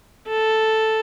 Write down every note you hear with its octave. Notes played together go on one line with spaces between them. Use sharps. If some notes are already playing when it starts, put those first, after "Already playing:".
A4